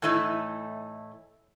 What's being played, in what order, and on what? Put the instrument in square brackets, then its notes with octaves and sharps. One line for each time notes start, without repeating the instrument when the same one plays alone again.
[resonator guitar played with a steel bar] A2 E3 A3 D#4 E4